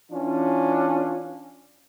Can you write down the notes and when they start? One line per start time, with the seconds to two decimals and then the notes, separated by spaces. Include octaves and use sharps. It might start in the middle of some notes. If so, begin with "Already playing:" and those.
0.12 E3 C#4 D4 F4